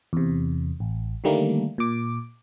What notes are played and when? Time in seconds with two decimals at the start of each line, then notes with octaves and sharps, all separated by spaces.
0.13 E2 C3
0.80 A1
1.24 D3 D#3 G3 A3 A#3
1.78 A#2 D6